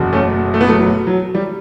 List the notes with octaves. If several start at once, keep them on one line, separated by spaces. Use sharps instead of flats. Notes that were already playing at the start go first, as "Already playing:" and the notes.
Already playing: F#1 E2 B2
A3 C#4
A3
B3
F#3 A3
F#3
F#3
G3